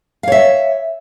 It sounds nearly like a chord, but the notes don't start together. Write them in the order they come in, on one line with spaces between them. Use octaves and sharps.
F5 C#5 E5